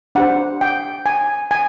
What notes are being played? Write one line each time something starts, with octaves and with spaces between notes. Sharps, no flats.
D4 G4 C5 F#5
G5
G#5
G#5